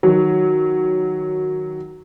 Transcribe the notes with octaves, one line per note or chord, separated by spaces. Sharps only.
D#3 F#3